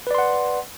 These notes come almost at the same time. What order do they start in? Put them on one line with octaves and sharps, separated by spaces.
B4 D5 C6 F#5